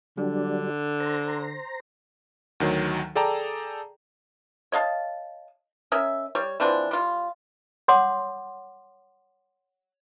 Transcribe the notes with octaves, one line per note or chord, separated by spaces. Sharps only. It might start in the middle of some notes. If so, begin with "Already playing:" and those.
D3 F#3 G3 D4
C5 A#5
D2 D#3 F#3
G#4 A4 D5 G5 A5 A#5
C#5 D#5 F5 A5
C#4 A#4 D#5 E5
G3 C#5
E3 F3 C4 D4
G3 F4
C#5 F#5 C6 D6 D#6